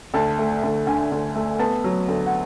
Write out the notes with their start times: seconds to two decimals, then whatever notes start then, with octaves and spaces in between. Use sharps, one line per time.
0.14 D2 A5
0.38 A3
0.63 D2
0.87 D3 G#5
1.12 D2
1.35 A3
1.59 B3 A5
1.84 F#3
2.08 D2
2.26 F#5